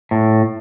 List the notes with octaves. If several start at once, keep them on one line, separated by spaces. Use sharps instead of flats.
A2